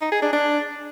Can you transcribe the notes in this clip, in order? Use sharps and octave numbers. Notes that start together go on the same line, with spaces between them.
D#4
G#4
D4
D4